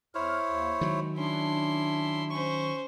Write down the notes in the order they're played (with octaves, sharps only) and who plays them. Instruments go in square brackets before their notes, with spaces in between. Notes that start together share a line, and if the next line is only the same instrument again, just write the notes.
[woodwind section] E2 F6 [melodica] E4 C5 C#5
[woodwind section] D#2
[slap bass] D#3 F#3 [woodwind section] G#3
[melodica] C#4 [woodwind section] D4 [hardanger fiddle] E4 C6
[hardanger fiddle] C#4 C5 [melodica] C#6